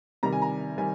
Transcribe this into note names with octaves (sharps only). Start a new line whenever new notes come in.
C3 D#3 G3 A#5
G#5
A#5
D#3 G3 G#5